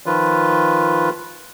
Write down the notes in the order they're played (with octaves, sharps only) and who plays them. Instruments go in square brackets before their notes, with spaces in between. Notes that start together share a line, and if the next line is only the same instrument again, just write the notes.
[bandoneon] D#3 F3 F4 B4